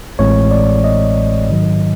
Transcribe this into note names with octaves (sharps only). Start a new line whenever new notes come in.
A1 A2 E3 G#3 C4 C#5
D5
D#5
G#2 D#3 F#3